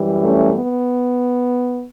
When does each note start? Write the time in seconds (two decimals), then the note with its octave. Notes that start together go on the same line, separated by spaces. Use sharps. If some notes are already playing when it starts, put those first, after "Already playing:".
Already playing: F#2 E3 G3
0.23 A3 C#4
0.54 B3